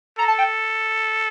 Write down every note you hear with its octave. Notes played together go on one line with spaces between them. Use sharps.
A4 A#5
A5
G5